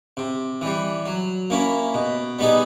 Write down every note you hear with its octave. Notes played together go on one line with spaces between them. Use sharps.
C3
E3 G3
F#3
A#3 C#4 E4
B2
G3 B3 D#4 G#4